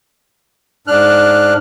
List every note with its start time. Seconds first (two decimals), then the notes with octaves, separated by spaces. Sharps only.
0.87 G#2 D4 F6 F#6